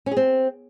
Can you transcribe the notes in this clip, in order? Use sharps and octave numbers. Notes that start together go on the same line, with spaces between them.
C#4
G#4
C4